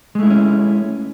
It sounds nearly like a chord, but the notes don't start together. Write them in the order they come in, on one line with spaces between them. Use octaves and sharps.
G#3 A3 E4 D#4 C#4